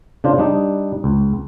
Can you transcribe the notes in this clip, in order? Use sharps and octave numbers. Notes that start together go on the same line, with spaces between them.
C#3 D4 F4 C5
G3 D4 D#4
C#2